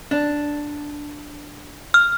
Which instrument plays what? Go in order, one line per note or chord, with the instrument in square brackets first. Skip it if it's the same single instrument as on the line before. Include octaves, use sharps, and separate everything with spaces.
[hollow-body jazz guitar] D4
[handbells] F6